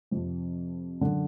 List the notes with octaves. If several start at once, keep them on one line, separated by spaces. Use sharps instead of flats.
F2 C3 F3
F#2 D3